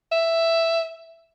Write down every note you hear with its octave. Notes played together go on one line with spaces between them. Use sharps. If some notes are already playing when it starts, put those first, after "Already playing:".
E5